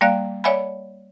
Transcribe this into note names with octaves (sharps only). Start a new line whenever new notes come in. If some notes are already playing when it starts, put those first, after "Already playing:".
G3 A#3 D5 F5 F#6
C#5 D5 E5 F#5 G#5 B5